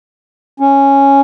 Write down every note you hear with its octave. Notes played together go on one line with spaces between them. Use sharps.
C#4